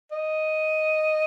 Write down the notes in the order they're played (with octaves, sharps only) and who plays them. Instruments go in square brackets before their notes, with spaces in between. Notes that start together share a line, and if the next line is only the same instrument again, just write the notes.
[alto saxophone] D#5